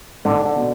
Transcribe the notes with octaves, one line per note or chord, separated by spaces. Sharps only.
G#2 D3
D3
B2